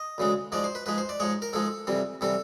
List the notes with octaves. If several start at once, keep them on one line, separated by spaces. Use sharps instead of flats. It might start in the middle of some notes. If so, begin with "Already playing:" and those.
Already playing: D#5
D2 C#3 E3 G#3
G#2 F3 G#3 D5
C5
B4
G#2 F3 G#3 B4
C5
D5
G#2 F3 G#3 C#5
A#4
G#2 F3 G#3 A4
F2 C3 E3 G3
C3 E3 G3 A4